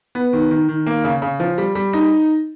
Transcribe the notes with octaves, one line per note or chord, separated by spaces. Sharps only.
B3
D#3
D#3
D#3
A#3
C#3
C#3
F3
G3
G3
D#4